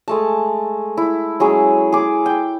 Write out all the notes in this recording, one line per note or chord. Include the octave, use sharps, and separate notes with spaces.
G#3 A3 A5
E4
F#3 G#3 C#4 G#4
G#4 D6
G5